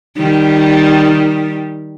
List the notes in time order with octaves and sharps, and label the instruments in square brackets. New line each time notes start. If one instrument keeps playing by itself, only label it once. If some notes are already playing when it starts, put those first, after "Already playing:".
[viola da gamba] D#3 G3